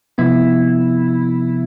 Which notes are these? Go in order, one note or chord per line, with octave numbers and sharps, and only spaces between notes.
C3 F3 B3 E4